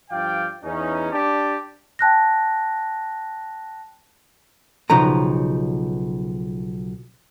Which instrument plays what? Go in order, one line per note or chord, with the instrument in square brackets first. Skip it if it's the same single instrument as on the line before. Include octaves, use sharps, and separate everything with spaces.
[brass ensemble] G2 F3 D5 F5 G5
E2 C#4 D#4
D4 G4 A5
[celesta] G5 A5 F#6 A#6
[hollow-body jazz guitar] B1 C#3 F3 D#4 B4 A#5